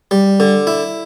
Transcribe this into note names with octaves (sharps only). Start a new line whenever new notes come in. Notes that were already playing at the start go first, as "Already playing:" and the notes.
G3
D3
E4